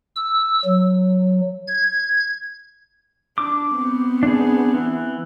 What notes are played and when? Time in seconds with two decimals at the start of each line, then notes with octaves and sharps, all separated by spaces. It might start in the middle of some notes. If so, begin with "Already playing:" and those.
0.16 E6
0.65 F#3
1.67 G#6
3.38 D4 D6
3.75 B3 C4
4.23 D4 G#4
4.74 E3